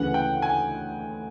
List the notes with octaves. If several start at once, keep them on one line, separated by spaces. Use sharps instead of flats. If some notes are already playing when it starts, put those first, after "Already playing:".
Already playing: D2 C#3 E3 F#5
G5
G#5